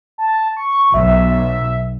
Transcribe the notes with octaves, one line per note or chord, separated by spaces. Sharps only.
A5
C#6
B1 E5